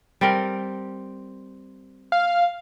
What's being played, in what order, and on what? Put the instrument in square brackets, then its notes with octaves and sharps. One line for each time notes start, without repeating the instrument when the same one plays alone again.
[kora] G3 C4 A#4
[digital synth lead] F5